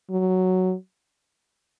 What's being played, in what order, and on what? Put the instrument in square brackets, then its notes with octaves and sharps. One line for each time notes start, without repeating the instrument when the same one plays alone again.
[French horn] F#3